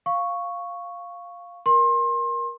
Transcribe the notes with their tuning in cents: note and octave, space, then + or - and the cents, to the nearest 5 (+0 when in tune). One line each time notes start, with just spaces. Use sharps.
F5 +0 C#6 +0
A#4 +20 C6 +30